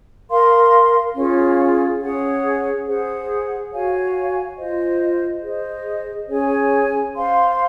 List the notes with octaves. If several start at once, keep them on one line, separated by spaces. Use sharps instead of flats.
A#4 F5 C6
C#4 F4 G#4
C#4 G#4 C#5 F#5
G#4 C5 F#5
F#4 C#5 F5 G#5
F4 C5 D#5
G#4 C5 D#5
C#4 G#4 C#5 G#5
C5 F5 C6